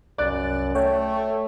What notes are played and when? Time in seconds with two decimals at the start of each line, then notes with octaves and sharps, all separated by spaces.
0.18 C2 F#2 D5 F#6 A6
0.75 A3 C#5 G5